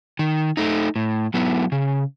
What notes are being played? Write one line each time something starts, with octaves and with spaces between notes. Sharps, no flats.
D#3
A3 D#4
A2
F#3 B3 E4
C#3